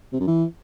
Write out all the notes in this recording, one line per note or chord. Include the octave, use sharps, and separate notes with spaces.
C3
F#2
E3